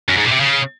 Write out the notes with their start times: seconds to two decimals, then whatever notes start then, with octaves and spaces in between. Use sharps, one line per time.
0.09 F#2
0.17 G#2
0.24 A#2
0.31 C3
0.40 C#3